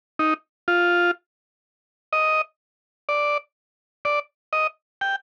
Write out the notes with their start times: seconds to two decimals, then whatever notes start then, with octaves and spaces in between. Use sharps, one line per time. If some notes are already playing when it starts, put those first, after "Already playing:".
0.19 D#4
0.68 F4
2.13 D#5
3.09 D5
4.05 D5
4.53 D#5
5.01 G5